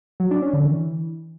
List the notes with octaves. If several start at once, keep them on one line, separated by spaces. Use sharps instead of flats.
F#3
D4
C#4
D3
E3